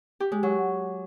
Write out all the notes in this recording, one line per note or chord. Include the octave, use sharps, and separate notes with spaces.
G4
G#3
F#3